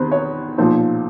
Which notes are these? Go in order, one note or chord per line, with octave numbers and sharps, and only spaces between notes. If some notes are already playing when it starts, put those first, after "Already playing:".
Already playing: E2 C3 D#3 B4 C5
C#5
B1 A#2 F3 C5